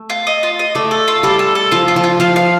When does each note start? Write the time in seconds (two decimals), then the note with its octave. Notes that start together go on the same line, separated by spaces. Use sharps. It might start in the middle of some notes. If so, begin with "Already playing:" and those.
Already playing: A3
0.10 F4
0.27 D#5
0.43 F4
0.59 D#5
0.75 A3 D5
0.91 A4
1.08 F4
1.23 G3 A4
1.39 A4
1.55 A4
1.71 F3 F4
1.88 F4
1.96 F3
2.04 F4
2.20 F3 F5
2.36 F5